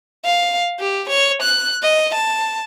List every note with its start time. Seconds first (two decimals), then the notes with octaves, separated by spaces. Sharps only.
0.25 F5
0.80 G4
1.10 C#5
1.43 F#6
1.83 D#5
2.15 A5